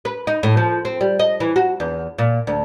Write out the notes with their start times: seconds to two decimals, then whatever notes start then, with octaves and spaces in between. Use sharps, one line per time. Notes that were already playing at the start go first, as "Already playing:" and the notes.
0.05 B4
0.27 D#4
0.43 A2
0.57 F3
0.85 C4
1.01 G3
1.19 D#5
1.40 E3
1.56 F#4
1.80 E2
2.18 A#2
2.47 D2